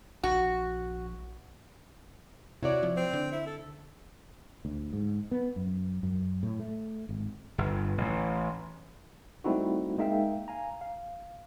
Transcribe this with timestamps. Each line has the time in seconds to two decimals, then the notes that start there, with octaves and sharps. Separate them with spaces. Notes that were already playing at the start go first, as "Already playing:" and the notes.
0.23 A#1 F#4
2.63 C3 E4 F#4 C#5 D5
2.83 F3
2.97 C4
3.13 D3
3.32 E4
3.47 A4
4.65 D2
4.93 G#2
5.31 B3
5.56 F#2
6.03 F#2
6.43 A2
6.59 A3
7.09 G#1
7.58 G1
7.98 A1
9.44 G3 A3 C4 D#4 E4 F#4
9.98 G#3 A#3 D#4 E5 F5 G5
10.48 F5 G#5 A#5
10.81 F5